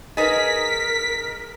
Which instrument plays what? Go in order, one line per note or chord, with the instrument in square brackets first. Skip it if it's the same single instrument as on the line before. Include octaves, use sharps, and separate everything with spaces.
[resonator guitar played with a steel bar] D#4 G#4 [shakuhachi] A#4 [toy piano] B4 D#5 [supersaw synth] B6